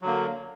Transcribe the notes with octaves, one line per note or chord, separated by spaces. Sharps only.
D3 F#3 A#3